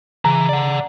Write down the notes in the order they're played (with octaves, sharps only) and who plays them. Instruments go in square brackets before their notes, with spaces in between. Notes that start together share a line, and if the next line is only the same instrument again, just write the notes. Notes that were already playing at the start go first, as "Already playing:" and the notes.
[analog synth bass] C#3 [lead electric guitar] E3 [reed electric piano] A#5
[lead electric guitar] D5 F#5